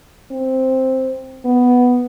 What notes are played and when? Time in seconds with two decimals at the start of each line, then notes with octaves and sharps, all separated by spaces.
0.31 C4
1.45 B3